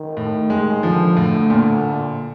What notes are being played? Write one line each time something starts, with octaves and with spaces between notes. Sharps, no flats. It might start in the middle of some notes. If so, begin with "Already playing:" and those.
Already playing: D#3
A2
G#3
D3 F3
A2
A#2